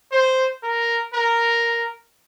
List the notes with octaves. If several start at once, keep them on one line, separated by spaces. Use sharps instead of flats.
C5
A#4
A#4